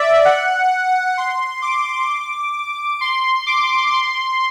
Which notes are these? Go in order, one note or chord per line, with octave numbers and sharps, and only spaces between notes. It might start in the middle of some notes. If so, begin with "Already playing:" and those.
Already playing: D5 E5
F#5
C6
D6
C6
D6
C6